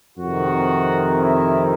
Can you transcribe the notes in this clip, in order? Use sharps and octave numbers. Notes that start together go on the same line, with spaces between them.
F2 C3 D#3 F#4
E4